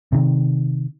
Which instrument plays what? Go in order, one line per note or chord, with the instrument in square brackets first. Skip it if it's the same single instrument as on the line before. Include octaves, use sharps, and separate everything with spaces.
[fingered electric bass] C3 D#3